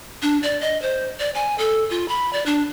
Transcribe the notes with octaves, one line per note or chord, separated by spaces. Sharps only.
D4
D5
D#5
C5
D5
G#5
A4
F4
B5
D5
D4